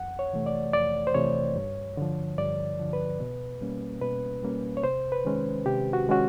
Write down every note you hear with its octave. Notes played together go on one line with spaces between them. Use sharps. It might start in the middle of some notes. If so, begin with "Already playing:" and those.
Already playing: F2 F#5
C#5
C3 E3 A3
D5
F2 D5
C5
C3 E3 A3 C#5
G2
D3 F3
G2 D5
D3 F3
B4
B2
G3 A#3 C#4
B2 B4
G3 A#3 C#4
C#5
C3 C5
B4
D#3 G#3 C#4
C3 G4
F#4
D#3 G#3 C#4 F#4